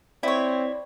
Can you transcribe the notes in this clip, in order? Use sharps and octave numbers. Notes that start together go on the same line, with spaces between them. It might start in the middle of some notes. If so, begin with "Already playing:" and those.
C4 E4 C#5 D5